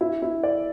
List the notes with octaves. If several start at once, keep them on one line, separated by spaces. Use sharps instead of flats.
E4
E4
D5